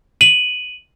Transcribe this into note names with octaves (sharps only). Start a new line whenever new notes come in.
D#7 F#7